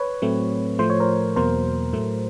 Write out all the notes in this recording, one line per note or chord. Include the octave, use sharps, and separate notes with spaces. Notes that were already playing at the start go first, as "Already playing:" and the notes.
Already playing: B4 C#5
A2 F#3 A3 C4
A2 F3 A3 C5
C#5
A#4 C5
E2 B2 F#3 A#3 A#4 C5
A2 F#3 A3